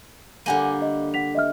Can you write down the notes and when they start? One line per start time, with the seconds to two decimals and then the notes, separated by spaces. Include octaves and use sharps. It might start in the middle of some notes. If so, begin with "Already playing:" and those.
0.46 D3 G3 A#3 F#5 G#5 D#7
0.82 D#5
1.14 F#5 B6 F7
1.35 D#5 E5 F6